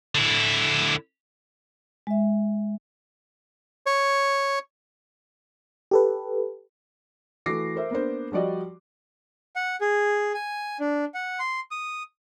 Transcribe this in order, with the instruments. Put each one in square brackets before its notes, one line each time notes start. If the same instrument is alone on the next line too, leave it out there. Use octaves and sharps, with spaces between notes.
[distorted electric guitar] D3 E4
[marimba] G#3 E5
[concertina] C#5
[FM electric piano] G4 A4 B4
[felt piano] E3 A3 F#4 D6 A#6 C7
A#4 C5 E5
A#3 B3 D4 C5
F3 G3 F#4 D5 D#5
[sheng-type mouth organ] F#5
G#4
G#5
D4
F#5
C6
D#6